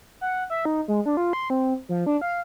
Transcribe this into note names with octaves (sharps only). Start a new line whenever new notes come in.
F#5
E5
D#4
G#3
D4
F4
C6
C4
F3
D4
F5